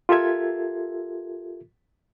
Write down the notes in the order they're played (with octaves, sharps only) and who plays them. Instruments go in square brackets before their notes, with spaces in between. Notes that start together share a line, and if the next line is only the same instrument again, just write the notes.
[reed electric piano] F4 G4 A4 A#4 E5 G#6